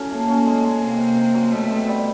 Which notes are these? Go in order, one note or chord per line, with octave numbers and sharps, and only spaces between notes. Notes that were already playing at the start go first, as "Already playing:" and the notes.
Already playing: A2 F#3 C#4
A3 A#3
C#4
G#3
G#3
C3 A#3
C3
C4
F#3
B2 A3
C4
G3